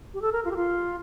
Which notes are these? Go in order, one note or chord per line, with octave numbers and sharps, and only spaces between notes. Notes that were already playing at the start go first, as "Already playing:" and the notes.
G4
A4
A#4
F4
G4
F4